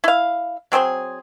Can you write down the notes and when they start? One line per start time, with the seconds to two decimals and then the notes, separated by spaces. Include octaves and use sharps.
0.04 E4 F5
0.72 F#3 C4 G#4 C5